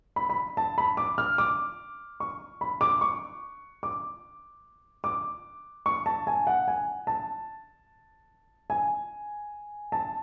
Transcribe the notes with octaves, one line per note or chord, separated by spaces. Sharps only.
B5
B5
A5
B5
D6
F6
D6
C#6
B5
D6
C#6
D6
D6
C#6
A5
G#5
F#5
G#5
A5
G#5
A5